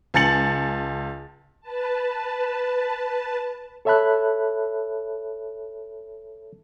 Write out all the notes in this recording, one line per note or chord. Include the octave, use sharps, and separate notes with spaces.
C#2 G#5 A5 A6 C#7 F#7
B4 A5
A4 C#5 E5 A5 B5 F#6